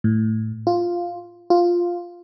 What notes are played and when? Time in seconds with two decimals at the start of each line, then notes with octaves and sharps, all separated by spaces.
0.04 A2
0.67 F4
1.50 F4